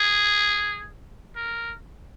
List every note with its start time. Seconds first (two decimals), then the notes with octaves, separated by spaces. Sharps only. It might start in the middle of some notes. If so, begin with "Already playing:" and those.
Already playing: G#4
1.36 A#4